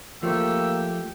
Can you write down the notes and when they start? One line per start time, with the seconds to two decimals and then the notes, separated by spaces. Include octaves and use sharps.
0.23 F3 A3 A#3 G4 E6